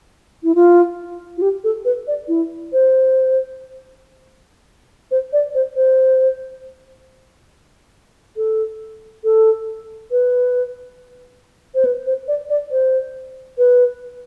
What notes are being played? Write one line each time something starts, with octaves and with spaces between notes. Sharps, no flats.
E4
F4
F4
G4
A4
B4
D5
E4
C5
C5
D5
C5
C5
A4
A4
B4
C5
B4
C5
D5
D5
C5
B4